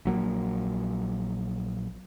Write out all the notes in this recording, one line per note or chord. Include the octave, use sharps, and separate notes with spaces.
A#1 F#3 A#3